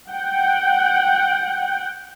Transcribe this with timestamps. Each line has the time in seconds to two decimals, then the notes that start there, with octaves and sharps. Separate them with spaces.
0.12 F#5 G5